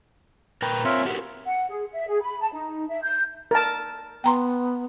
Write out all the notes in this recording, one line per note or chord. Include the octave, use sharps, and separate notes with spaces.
A#2 A#4 B4 G5 A#5
C4 F4 A#4 C#5 E5
F#4 G4 A#4 F#5
F#5
G#4
E5
G#4
B5
A5
D#4
E5
G6
A#4 A5
B3 G5 A#5 C6